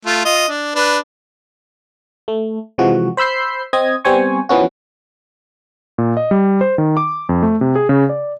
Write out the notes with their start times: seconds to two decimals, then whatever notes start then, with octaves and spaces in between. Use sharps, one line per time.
0.06 A3 F4
0.25 F4 D#5
0.48 D4
0.76 D4 B4
2.28 A3
2.78 C3 E3 F3 G#3 F#4
3.17 C5 B5 E6 G6 C7
3.73 C4 D#5 G#6
4.04 G3 B3 C4 C5 G#5 C#6
4.49 E3 F3 B3 C#4 F#4
5.98 A#2
6.17 D#5
6.31 G3
6.61 C5
6.78 D#3
6.97 D6
7.29 F2
7.43 A3
7.61 C3
7.75 G#4
7.89 C#3
8.09 D5